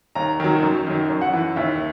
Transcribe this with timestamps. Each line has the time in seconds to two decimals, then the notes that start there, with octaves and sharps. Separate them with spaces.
0.15 D#2 A#5
0.40 D#3 F#3
0.63 F#2
0.87 D#3 F#3
1.09 F#2
1.21 F#5
1.33 E3
1.56 D#2 E5